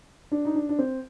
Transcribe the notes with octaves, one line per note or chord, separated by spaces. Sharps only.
D4
D#4
D4
D4
C4